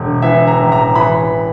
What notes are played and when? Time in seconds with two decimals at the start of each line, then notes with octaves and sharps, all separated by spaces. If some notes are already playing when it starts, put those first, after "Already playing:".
Already playing: E1 D3
0.22 E3 E5
0.47 A#5
0.59 A1
0.72 A#5
0.95 E3 B5